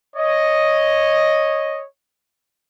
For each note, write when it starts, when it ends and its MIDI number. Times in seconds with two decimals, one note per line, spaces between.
0.17 1.82 73
0.17 1.82 75